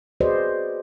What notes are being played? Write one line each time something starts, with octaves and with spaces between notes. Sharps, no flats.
F#4 G#4 B4 C5 D5 D#5